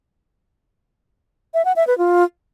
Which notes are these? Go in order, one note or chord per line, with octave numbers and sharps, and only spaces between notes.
E5
F#5
E5
B4
F4